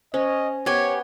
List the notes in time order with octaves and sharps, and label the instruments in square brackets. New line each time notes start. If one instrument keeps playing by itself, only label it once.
[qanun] C#4 [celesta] C5 [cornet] D#5
[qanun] B3 [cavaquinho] G4 G#5 [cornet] C#5